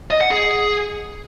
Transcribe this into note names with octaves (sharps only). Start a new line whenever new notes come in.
D#5
F#5
G#4